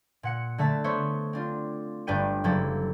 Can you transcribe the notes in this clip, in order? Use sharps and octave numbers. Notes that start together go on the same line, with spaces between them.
A#2 F#5 C#7
D3 A3 E5 A5
B3 C5 C#5 E5
C4 D4 F4
G1 G2 D4 B4 G5 D#7
F#1 F3 F#3 E4 G4 A4